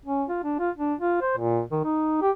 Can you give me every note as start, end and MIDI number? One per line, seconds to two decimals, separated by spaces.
0.06 0.24 61
0.29 0.40 65
0.44 0.55 62
0.59 0.70 65
0.78 0.94 62
1.00 1.21 65
1.22 1.34 72
1.37 1.62 46
1.72 1.79 51
1.84 2.22 63
2.22 2.31 67